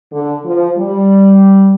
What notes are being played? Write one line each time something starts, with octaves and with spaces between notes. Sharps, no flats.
D3
F3
G3